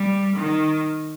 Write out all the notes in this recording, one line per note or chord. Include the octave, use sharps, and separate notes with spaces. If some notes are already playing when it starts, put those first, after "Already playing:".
Already playing: G3
D#3